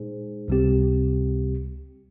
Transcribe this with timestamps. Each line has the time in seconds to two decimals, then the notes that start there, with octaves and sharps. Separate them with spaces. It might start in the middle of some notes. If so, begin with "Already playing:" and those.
Already playing: A#2 G#3 D#4 G#4 C5
0.48 C#2 C3 G3 C4 G4